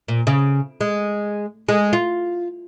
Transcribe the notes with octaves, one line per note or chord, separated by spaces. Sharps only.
A#2
C#3
G#3
G#3
F4